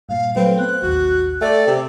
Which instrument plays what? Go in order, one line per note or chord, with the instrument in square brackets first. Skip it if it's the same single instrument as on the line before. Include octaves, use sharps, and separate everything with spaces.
[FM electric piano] G2 A#2 [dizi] F5
[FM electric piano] F#3 A3 B4 [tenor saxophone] C4 [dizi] F5
[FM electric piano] B3 [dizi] F#6
[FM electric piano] A1 D#2 [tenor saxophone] F#4
[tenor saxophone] A3 [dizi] D5 [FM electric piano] G5 A6
[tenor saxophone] C3